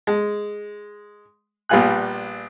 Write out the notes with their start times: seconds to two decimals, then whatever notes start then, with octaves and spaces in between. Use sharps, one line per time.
0.07 G#3
1.69 A#1 G3 B3 F4 G#5 F#6